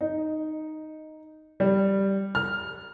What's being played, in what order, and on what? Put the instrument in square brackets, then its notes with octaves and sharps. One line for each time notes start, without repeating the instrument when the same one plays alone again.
[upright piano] D#4
G3
F6